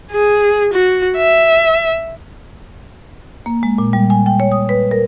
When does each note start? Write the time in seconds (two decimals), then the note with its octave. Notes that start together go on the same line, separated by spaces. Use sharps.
0.11 G#4
0.73 F#4
1.17 E5
3.46 A#3
3.63 G#3
3.78 A#2
3.93 G3
4.10 G#5
4.26 G5
4.40 C#5
4.52 D#6
4.69 B4
4.91 A#4